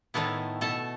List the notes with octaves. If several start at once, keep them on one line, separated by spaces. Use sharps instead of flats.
A2 D#3 A3 B3 E4
B2 A3 A4 A5